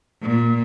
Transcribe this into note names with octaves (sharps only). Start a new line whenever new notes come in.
A#2